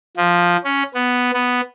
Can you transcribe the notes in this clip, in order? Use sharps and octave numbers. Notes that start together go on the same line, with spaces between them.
F3
C#4
B3
B3